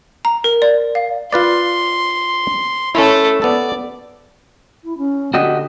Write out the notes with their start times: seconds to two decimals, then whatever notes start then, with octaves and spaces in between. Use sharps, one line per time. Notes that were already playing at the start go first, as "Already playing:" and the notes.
0.25 A#5
0.44 A#4
0.62 D5
0.95 F5
1.33 F4 B4 D5 C6
2.95 A3 C#4 E4 A4
3.42 B3 A4 D5
4.84 E4
4.98 C#4
5.34 D3 F#4 G4 D#5